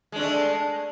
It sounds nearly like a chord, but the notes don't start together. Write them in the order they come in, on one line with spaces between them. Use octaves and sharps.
G#3 D4 A3